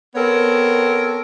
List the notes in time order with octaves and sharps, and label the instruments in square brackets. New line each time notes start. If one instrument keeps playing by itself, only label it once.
[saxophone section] B3 C4 A4 A#4 C#5